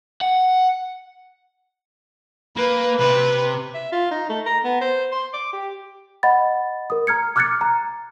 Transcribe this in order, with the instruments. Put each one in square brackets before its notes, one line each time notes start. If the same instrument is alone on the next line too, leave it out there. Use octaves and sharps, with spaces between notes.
[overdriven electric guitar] F#5
[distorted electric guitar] A#3 [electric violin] B4
[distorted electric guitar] C3 [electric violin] B4
[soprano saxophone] E5
F4
D#4
A3
A#5
B3
C5
C6
D6
G4
[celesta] D#5 F#5 B5 A6
A#4 D#6
A#5 F6 G#6 C#7
D6 F6 F#6 G#6 A6 C#7
A#5